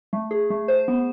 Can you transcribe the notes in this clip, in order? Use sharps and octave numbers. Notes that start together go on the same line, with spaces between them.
A3
G#4
A3
C5
B3